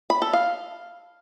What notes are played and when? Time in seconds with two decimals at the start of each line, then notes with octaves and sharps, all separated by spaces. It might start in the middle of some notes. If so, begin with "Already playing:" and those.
0.10 B5
0.22 A4
0.33 F5